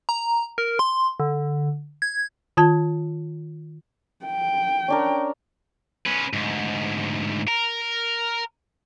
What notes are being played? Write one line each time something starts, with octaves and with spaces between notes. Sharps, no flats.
A#5
A#4
C6
D3
G#6
D#3 F4 A5 G#6
G5
C#4 D4 A#4
C#4 B4
D2 G#2
A#4